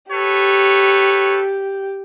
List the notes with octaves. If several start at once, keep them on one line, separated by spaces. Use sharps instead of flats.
G4 A4 B4 C#5